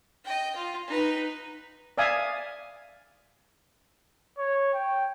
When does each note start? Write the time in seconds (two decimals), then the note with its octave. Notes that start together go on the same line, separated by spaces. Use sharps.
0.24 D#5 G5
0.56 F4
0.87 D#4 B4
1.98 D5 E5 F5 G#5 D#6
4.38 C#5
4.74 G5